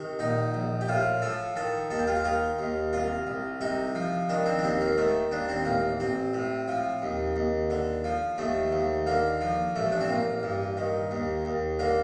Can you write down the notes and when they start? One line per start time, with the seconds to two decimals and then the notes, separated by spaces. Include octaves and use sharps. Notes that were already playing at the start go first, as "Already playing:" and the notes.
Already playing: C3 D#3
0.19 A#1 D#4
0.54 A#1
0.81 G4
0.88 A2 F4
1.22 F3 A4
1.56 D#3 A4
1.90 D#2 A4
1.99 G4
2.07 F4
2.16 G4
2.24 D#3 F4
2.59 D#2
2.93 C2 F4
3.27 C2
3.61 C3 D#4
3.95 F3
4.29 D#3 D4
4.46 C4
4.59 D4
4.63 D#2 C4
4.81 A#3
4.97 D#3 A3
5.31 D#2 D4
5.49 C4
5.65 A1 A#3
6.00 A1 C4
6.34 A2
6.68 F3
7.02 D#2
7.36 D#2
7.70 D3
8.04 F3
8.38 D#2 A3
8.72 D#2
9.06 D3 A#3
9.41 F3
9.76 A1 A3
9.92 D4
10.00 C4
10.09 A1 A#3
10.43 G2
10.77 D#3
11.11 D#2
11.45 D#2
11.79 D3 A#3